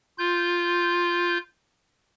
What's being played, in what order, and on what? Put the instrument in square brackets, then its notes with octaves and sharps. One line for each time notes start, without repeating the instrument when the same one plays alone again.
[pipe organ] F4 G6